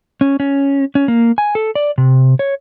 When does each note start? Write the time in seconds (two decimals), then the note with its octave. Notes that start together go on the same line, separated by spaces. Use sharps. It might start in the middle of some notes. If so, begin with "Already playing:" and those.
0.21 C#4
0.40 C#4
0.95 C#4
1.08 A#3
1.38 G#5
1.55 A4
1.75 D5
1.98 C3
2.39 C#5